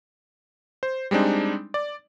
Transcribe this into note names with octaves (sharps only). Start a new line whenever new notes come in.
C5
G3 G#3 C4 D4 D#4
D5